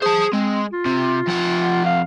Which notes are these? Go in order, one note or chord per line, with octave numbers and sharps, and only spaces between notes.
G#4 C5 A5
G#3 C4
F4
C3
F2 F#5
F5